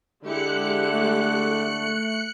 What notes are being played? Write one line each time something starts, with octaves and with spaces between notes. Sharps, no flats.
D3 G#3 E4 G4 F#6 C#7
A3